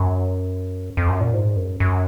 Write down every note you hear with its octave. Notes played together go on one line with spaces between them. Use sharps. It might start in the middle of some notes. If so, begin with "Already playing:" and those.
Already playing: F#2
F2
F#2
A#2
G#2
F#2
F#2